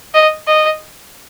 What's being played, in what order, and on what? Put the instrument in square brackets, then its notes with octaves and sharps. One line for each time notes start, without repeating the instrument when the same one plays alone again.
[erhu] D#5
D#5